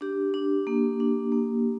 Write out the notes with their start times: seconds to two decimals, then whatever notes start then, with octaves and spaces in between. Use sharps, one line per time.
0.01 D4 G4
0.34 D4
0.67 A#3
1.00 D4
1.32 A#3